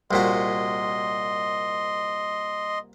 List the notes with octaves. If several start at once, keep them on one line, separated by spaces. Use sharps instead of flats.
C2 A#2 F#4 D#5 C6